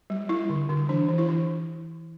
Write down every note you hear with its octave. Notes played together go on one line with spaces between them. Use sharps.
G3
G3 E4
D3
D3
E3 D4
E3
E4
E3